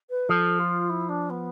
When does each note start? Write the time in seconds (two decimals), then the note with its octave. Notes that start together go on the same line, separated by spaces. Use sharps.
0.10 B4
0.29 F3 A4
0.59 F4
0.89 E4
1.09 D4
1.30 B3